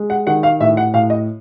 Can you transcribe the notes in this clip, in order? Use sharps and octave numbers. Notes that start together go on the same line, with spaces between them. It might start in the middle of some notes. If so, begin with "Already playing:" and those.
Already playing: G#3
F#5
D#3 F#5
F5
A2 E5
F#5
A2 F5
D#5